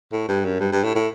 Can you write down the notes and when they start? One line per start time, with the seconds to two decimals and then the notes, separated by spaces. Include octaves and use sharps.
0.12 A2
0.29 G2
0.45 F#2
0.60 G2
0.72 G2
0.84 A2
0.95 A2